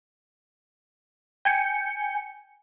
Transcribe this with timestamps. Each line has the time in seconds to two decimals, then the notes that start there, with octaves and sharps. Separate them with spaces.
1.45 G5 G#5 C#7